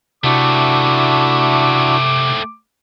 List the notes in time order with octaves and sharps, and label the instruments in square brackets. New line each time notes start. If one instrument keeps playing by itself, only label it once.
[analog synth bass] C3 [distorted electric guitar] A3 C4 [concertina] D4 E4 F#4 [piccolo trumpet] D6